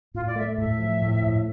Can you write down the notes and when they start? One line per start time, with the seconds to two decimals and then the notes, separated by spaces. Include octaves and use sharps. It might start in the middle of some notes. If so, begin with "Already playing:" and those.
0.14 A2 F4
0.26 D5
0.36 A3 E5
0.58 A2 E5
0.79 F3
1.01 A2
1.23 A2